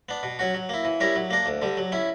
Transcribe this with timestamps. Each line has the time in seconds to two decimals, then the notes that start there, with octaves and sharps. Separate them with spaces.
0.09 B3 D4
0.23 B2
0.39 F#3 C#4 F#4
0.54 F#3
0.69 A#3 E4
0.85 E3
1.00 G3 C#4 E4 A#4
1.16 F#3
1.30 A#3 D4 A#4
1.46 D2
1.62 D3 G3
1.77 F#3
1.92 C#4 E4